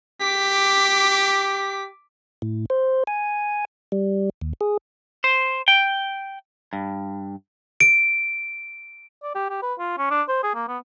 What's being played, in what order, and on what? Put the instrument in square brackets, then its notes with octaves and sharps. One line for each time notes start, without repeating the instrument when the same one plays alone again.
[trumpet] G4 [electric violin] D6 B6
[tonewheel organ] A2
C5
G#5
G3
D#2
G#4
[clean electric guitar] C5
G5
G2
[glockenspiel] D7
[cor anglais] D5
G4
G4
B4
F4
C#4
D4
C5
G#4
A#3
B3